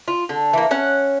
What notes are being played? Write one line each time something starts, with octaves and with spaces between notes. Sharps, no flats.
F4
D3
E3 A#3
C#4 F#5